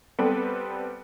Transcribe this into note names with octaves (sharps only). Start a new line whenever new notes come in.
G3 B3 C4 G4 A4 B4